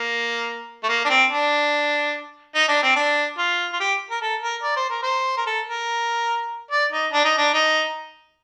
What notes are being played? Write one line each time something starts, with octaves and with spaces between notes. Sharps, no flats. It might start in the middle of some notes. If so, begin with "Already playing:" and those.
Already playing: A#3
A3
A#3
D4
C4
D4
D#4
D4
C4
D4
F4
F4
G4
A#4
A4
A#4
D5
C5
A#4
C5
A#4
A4
A#4
D5
D#4
D4
D#4
D4
D#4